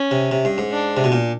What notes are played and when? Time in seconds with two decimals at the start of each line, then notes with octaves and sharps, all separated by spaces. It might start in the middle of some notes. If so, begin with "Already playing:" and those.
Already playing: C#4
0.11 C3
0.31 C3
0.45 G2
0.58 G#2
0.72 D4
0.97 C3
1.04 B2
1.12 A#2